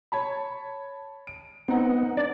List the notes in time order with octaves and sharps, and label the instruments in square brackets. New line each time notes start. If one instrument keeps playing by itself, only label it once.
[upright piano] C#5 A5 B5
D7
[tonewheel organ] B3 [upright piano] C4 D#4 F#5
[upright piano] D4 [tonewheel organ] D5